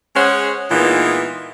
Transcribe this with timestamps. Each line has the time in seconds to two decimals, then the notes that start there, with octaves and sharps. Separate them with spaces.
0.15 G#3 C#4 G#4 C5 C#5 F#5
0.70 A#2 E3 G#3 B3 D#4 F4